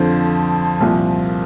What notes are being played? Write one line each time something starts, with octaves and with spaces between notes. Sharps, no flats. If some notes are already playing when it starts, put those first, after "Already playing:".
Already playing: F2 D3 F3 C5
C2 A#2 F3